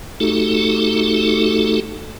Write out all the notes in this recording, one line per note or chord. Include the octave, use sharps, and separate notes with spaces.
A3 D#4 F#4 G4 A4